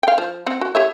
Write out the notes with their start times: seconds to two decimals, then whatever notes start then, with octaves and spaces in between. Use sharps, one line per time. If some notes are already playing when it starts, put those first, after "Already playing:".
0.03 F5 G5
0.18 F3
0.46 C4 F#5
0.61 F#4
0.75 G4 C#5 E5